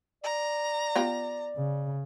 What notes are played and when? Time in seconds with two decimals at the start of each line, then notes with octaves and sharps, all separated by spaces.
0.24 D5 A#5
0.96 B3 F4 G4
1.56 C#3